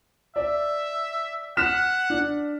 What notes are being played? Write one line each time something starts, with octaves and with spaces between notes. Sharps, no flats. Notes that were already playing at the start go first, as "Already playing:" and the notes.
D5 E5
F#5 F6 B6 E7
D4